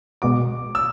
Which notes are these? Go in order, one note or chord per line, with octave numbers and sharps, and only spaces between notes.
B2 G#3 B3 F#4 D6
E6